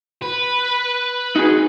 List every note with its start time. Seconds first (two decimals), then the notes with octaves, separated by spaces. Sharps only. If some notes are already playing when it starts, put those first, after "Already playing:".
0.22 B4
1.36 D#4 F#4 G#4